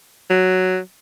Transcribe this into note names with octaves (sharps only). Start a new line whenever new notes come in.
F#3